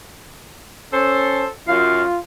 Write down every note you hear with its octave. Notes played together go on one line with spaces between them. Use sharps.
C#4 A4 C5
F#2 F4 F5